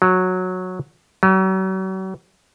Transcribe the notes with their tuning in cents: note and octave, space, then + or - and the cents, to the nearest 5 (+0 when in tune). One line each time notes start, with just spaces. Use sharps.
F#3 -10
F#3 +40